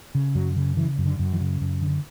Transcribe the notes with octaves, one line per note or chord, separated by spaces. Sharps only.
C#3
F#2 F#3
C#3
C#3 E3
F#2
D3
F#2
E3
C#3
F#2
D3